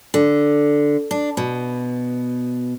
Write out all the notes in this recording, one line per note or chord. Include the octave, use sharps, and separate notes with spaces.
D3
D4
B2